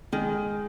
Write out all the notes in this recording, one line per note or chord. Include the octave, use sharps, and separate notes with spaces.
D#3 G#3